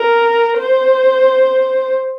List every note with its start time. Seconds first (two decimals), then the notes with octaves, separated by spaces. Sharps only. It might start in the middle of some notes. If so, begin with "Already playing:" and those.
Already playing: A#4
0.57 C5